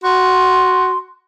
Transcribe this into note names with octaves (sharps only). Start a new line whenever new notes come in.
F#4 C6